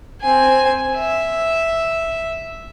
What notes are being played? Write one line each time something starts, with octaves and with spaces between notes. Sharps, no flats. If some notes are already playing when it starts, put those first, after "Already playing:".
C4 G#5
E5